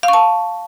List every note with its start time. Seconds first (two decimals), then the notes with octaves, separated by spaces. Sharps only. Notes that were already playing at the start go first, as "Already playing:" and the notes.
0.03 F5
0.08 C#6
0.13 A5